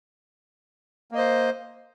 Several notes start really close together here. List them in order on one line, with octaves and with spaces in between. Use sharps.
A#3 D#5 C5